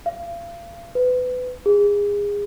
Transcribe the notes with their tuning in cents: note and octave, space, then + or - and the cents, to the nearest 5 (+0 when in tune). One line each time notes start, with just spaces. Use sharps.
F5 -35
B4 +25
G#4 -25